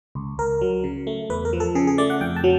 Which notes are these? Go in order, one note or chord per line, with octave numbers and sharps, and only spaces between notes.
C#2
C#2 A#4
F#3
C#3
A3
E2 B4
A#4
F3
A4
C#3 G#4
G#4
A3 D5
F#5
F2 G5
A5
F#3